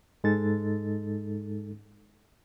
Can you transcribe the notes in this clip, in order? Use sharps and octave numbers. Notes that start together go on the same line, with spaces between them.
G#2 G#3 D#4 A4 A6